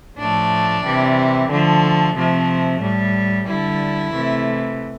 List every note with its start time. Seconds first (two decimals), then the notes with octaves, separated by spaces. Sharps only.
0.18 A2 F3 A3 D4
0.84 C3 E3 G3
1.49 D3 F3 A3
2.15 C3 F3 A3
2.81 A2 G3
3.47 D3 G3 E4
4.13 C3 E3 A3